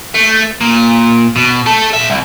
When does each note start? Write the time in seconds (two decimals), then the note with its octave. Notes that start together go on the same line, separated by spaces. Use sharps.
0.14 A3
0.61 A#2
1.36 B2
1.66 A3 A4
1.94 A#2 E5
2.10 C2